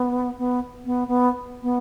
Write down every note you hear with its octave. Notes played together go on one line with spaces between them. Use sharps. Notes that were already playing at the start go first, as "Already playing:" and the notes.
Already playing: B3
B3
B3
B3
B3